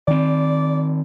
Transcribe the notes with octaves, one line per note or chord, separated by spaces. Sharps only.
D#3 C4 D5